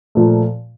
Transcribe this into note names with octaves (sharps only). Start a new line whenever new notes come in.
A#2 F3 A3